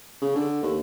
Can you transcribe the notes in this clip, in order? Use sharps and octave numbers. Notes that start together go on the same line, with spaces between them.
C#3
D3
D#2